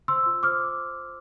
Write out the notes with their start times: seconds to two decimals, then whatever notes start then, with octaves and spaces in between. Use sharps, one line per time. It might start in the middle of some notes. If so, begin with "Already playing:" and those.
0.08 C5 C6 E6
0.26 F4
0.43 C5 D6 F6